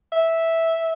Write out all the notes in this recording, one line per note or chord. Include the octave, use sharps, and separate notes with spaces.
E5